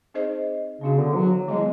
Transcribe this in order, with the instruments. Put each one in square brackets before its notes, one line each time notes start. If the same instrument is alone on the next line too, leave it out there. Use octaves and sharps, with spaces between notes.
[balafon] C4 D#4 G#4 C5 D#5
[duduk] C#3 [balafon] B3 D4 F#4
[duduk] D3
F#3
[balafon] D#3 G3 B3 E4 [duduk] G#3